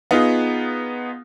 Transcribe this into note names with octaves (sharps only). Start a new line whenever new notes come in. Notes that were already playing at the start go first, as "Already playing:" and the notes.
B3 D#4 F4 G#4